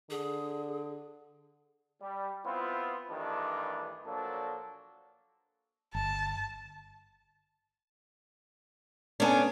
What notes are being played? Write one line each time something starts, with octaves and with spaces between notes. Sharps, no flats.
D3 G#4
G3
B3 C4 E4 F4
G2 D#3 E3 G3 A3 D4
A#2 F3 F#3 A#3 D4 A4
G1 A5
B3 C#4 D4 A4 G#5